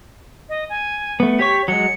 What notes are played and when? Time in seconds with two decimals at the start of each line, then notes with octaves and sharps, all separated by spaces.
0.49 D#5
0.70 G#5
1.20 A3 B3
1.39 G4 C#5 C#6 B6
1.68 F#3 G#3 C#7